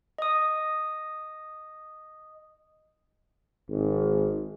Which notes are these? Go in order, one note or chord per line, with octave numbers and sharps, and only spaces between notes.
D#5 D#6
G#1